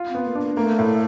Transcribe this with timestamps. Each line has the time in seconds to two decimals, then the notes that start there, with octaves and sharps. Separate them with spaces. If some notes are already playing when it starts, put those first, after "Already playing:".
Already playing: F4
0.09 C4
0.15 B3
0.24 A#3
0.35 A#3 D4
0.57 A3 A#3
0.79 A2